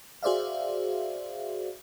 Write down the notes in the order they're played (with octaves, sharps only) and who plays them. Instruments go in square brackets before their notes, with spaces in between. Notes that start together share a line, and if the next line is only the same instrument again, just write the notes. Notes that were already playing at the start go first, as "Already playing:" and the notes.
[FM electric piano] F#4 G#4 C5 D5 E5 F5